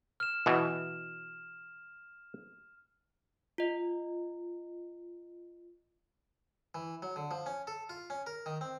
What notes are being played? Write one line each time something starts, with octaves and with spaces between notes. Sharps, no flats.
F6 E7
B2 E3
F4 D#5
E3
F#3
D3
F3
C#4
A4
F4
C#4
A#4
D#3
C4